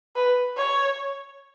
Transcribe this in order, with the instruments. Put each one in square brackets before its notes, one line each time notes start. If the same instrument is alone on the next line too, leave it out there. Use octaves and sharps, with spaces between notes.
[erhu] B4
C#5